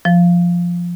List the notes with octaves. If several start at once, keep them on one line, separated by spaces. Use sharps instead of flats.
F3